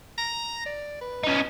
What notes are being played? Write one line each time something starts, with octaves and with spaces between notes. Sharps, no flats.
A#5
D5
B4
C#4 D#4